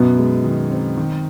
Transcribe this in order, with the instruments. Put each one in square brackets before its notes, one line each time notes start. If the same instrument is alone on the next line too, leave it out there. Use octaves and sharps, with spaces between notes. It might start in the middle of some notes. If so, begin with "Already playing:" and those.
Already playing: [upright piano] F#2 [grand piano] B2 B3
[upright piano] G#3
D#3
C4
D#3